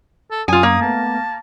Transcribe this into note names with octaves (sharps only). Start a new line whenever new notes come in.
A4
F#2 F4 G#5 D#6
A#3
A3 B3 A5